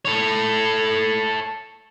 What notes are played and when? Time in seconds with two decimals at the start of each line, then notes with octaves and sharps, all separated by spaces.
0.05 A4 C#5